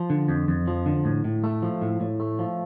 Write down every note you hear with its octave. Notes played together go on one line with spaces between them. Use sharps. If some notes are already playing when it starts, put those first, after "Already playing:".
Already playing: F3
D3
F2
F2
F3
D3
A2
A2
A3
F3
A2
A2
A3
F3